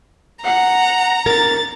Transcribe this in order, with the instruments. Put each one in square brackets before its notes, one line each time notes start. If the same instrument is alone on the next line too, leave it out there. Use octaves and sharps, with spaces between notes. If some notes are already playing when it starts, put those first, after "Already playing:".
[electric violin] F#5 [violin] A#5
[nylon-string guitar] A#4 [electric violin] A6